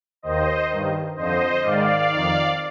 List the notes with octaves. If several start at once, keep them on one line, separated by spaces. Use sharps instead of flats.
D#2 D#3 C5 D#5
G2 D#3
F2 D3 C5 D#5
G#2 D#3 D5 F5
D#3
F2